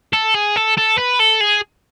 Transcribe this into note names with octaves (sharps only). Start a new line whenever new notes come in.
A4
G#4
A4
A4
B4
A4
G#4